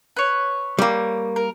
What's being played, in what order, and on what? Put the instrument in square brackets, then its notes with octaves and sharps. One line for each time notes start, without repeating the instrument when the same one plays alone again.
[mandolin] B4 C#5
[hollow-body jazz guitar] G3 A#3
[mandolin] A#4